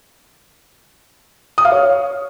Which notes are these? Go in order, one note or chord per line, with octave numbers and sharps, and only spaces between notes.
D#6
F5
C#5